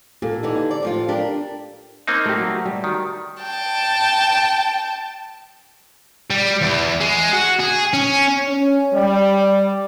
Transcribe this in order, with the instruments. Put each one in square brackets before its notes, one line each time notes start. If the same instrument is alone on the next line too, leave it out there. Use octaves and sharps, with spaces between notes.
[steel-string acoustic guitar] A#2 [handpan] G4 A4
[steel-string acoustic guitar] D3 E3 D#4
D5
A2 F3 F4
D4 G4 A#4
[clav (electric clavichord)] A#3 C4 D#4
[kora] A3 G4
F#3
G3
[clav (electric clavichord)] D#3
[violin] G5 A5
[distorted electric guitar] G3
E2
G#3
F#4
G#4
C#4
[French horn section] C#4
G3